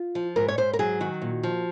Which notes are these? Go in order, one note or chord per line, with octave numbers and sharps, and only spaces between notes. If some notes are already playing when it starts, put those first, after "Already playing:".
Already playing: F4
F3
G#2 A#4
C#5
G#2 C5
A#4
F#3 G#4
D#3 F#4
A#2
F3